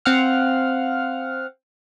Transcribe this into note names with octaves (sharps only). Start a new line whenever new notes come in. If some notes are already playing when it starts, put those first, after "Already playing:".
C4 F5 F#5 F6